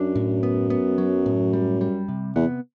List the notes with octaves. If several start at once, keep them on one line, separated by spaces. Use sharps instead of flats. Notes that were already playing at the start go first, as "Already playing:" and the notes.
Already playing: F#2 D4
A2
B3
B3
F#3
A2
G3
G3
C3
E2 B3